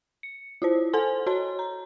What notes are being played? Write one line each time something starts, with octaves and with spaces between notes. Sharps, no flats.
C#7
E4 F4 C5
A4 C5 G#5 C6
F#4 C#5 A5 C6
A#5